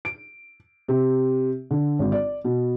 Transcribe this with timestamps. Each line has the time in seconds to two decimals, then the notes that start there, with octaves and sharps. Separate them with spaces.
0.05 D7
0.88 C3
1.71 D3
1.99 G#1
2.12 D5
2.45 B2